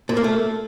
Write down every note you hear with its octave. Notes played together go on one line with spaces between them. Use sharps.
A#2
A#3
A3